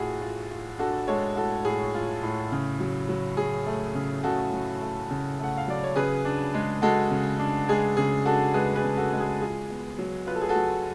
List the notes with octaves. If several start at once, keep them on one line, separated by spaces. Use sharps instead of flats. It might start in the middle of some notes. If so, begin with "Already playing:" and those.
Already playing: A2 F4 F#4 G#4
F4
F4
D4 F#4 A4
G#3 A4 C#5
A2 F#4 A4
A2 G#4
F4
A2
C#3
F#3
F#3
F#3 G#4
A3
C#3
C#3 F#4 A4
F#3
A3
C#3
A3 F#5
F5
F#3 D5
C#5
C#3 G#4 B4
D4
G#3
G#3 F#4 A4
C#3
D4
G#3 G#4
C#3 G#4
D4 F#4 A4
G#3 G#4 B4
G#4 B4
C#3
F#4 A4
G#3
G#4
F4 G#4
B3
F#3
F4 B4
A4
G#4
F#4 A4
F#3